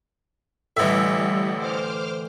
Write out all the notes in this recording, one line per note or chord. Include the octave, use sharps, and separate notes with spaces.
A1 A2 D3 E3 G3 E5
C5 D6 F6